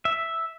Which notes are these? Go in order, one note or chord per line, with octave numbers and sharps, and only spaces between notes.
E5